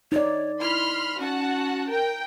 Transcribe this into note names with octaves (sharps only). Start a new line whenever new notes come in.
D#4 C#5 D5
E4 B5 C6 F6
C#4 F#4 F#5 A5
A#4 G5